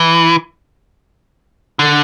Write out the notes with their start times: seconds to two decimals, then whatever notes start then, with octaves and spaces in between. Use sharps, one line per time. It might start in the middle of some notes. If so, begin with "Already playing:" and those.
Already playing: E3
1.79 D3